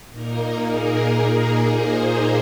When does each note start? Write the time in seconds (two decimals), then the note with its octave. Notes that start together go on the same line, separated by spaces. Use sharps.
0.10 A#2 A#3 D#4 A#4
0.64 G#4
1.17 A#4
1.71 C5